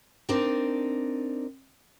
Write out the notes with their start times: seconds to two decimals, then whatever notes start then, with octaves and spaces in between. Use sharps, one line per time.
0.29 C4 D4 D#4 A#4 D5